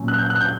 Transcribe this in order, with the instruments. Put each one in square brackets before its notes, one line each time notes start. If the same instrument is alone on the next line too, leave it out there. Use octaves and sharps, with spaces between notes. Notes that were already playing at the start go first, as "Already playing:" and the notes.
Already playing: [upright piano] A#2 F#3 C#4
F#6
G6
F#6
G6